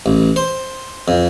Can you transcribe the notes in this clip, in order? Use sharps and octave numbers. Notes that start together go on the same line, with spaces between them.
A1
C5
F2